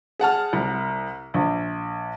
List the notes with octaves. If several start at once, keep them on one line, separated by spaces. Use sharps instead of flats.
G#4 F#5 A5 F6
C2
A#1